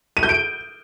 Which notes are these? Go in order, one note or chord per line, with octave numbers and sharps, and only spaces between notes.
D#7
G6
D7